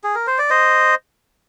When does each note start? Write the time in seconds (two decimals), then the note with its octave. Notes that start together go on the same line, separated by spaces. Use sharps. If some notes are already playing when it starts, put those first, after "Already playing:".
0.04 G#4
0.15 A#4
0.27 C5
0.38 D5
0.50 C5 D#5